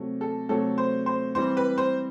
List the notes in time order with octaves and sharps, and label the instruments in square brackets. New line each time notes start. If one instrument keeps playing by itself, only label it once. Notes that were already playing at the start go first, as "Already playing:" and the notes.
Already playing: [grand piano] C3 F#3 A3
[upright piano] A4
[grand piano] C3 F#3 A3 [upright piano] A4
[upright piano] C5
C5
[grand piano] E3 G3 C4 [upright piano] C5
[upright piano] B4
C5